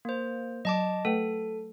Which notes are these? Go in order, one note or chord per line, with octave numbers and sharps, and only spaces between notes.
A#3 C5
F#3 D#5 A5 D6
A3 A4 B4 G5